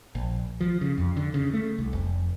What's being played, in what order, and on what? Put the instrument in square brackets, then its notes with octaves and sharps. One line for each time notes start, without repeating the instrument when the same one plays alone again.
[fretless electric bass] A#1
F3
C#3
F2
D3
C#3
A3
C2
F1